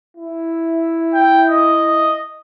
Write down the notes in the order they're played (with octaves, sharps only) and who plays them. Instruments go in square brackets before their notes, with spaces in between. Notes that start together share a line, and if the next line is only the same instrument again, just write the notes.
[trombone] E4
[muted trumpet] G5
D#5